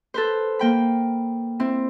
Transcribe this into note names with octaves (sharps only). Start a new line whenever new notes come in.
A4 B4 C5
A#3 G5 B5
C4 E4